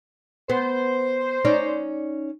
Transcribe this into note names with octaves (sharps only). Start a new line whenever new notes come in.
B3 C5
C#4 D#4 D5